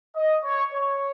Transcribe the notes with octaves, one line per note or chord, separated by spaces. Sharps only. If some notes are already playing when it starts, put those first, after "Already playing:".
D#5
C#5
C#5